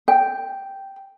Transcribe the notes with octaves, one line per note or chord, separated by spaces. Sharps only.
G5